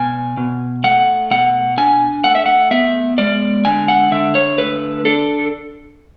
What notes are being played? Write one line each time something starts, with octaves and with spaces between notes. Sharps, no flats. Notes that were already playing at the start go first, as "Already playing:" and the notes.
Already playing: B2 G#5
B2
A3 F#5
B2 F#5
D4 G#5
A3 F#5
E5
F#5
B3 E5
G#3 D5
D3 G#5
F#5
D3 E5
C#5
A3 B4
D4 A4